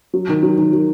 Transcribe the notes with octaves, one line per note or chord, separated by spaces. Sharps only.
F#3
D#3
F#3
D#3
F#3